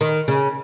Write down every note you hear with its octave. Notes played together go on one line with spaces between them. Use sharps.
D#3
C#3